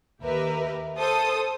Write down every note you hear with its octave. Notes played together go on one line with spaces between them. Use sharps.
D#2 G4 A#4 B4 E5
A4 C5 D#6